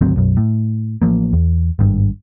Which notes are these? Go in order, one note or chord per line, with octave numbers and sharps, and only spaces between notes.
G#1 D2 F#3 C4
B1 F#2
A2
A1 F3 A#3
E2
G#1 G2